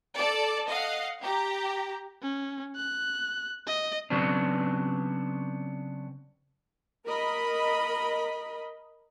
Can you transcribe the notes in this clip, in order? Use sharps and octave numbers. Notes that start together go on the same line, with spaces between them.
A4 D5 A5
D#5 F5 F#5
G4 A#5
C#4
F#6
D#5
C#3 F#3 B3 C4 D4
A#4 D#5 B5